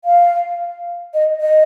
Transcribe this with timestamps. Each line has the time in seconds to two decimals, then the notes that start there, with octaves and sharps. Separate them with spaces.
0.05 F5
1.14 D#5
1.41 D#5